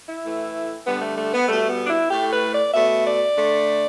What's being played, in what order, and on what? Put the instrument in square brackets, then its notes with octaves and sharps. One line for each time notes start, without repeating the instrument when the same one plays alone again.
[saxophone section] E4
A2 E3 A3
D3 G3 B3
A3
A3
B3
B2 G3 A3
B3
D4
E4
A2 A3 G4
B4
D5
B2 A3 E5
D5
D3 A3